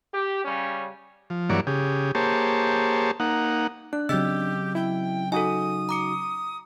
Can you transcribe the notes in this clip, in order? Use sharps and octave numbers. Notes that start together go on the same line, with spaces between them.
G4
C#3 G3 C#4
F3
G2 E3 F#3 A#3 C#5 D5
C#3 G4 G#4
A#3 G4 G#4 C5 C#5 A5
A#3 D#4 F#5
D4 F#6
C#3 F#3 C4 G4 D#5 E6
E4 G5
D#4 F#4 A4 G#5 D#6
A#5 D6 C#7